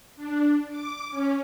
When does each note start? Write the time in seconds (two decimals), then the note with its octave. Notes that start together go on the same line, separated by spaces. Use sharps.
0.15 D4
0.70 D6
1.10 C#4